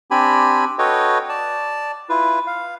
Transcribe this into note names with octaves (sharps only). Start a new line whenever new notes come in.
C4 D4 G4 G#5 B5
F#4 A4 B4 C#5 D#5 G5
D5 A5
E4 F4 B4
F5